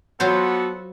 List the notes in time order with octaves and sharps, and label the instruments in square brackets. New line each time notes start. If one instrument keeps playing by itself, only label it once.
[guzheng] F#3 F4 C5 [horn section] B3 F#4 A4